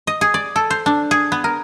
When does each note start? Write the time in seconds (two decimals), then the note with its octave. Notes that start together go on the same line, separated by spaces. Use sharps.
0.07 D#5
0.21 G#4
0.34 D5
0.56 A4
0.70 C5
0.86 D4
1.11 G#4
1.32 B3
1.44 A#4